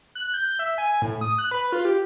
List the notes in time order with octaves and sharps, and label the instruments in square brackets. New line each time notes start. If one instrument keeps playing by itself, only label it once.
[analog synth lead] F#6
G6
E5
G#5
A2
D#6
F#6
B4
F4
G4